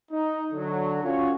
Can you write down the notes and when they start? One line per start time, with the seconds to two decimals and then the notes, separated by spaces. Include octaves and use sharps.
0.11 D#4
0.53 D3 F#3
1.04 C#4 F4 F#4 C#5